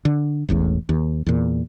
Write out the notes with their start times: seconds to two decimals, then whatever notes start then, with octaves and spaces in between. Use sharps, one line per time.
0.05 D3
0.49 E1 A1 E2 A2
0.89 D#2
1.26 E2 A#2